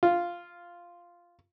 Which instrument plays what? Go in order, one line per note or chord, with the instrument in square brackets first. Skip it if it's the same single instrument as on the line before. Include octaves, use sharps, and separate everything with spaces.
[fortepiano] F4